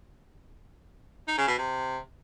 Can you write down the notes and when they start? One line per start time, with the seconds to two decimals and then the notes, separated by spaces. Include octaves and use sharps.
1.28 D#4
1.38 C#3
1.48 B2
1.58 C3